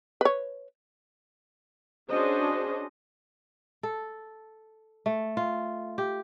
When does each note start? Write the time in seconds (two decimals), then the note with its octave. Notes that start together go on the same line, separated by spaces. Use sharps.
0.21 B4 C#5
2.10 C#4 D4 F#4 G#4 C5 D#5
3.83 A4
5.06 A3
5.37 F4
5.98 G4